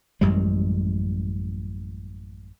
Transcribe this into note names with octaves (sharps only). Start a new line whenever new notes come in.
A1 F#2 G3 G#3